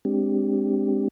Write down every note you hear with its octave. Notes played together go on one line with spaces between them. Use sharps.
G#3 C4 D4 G4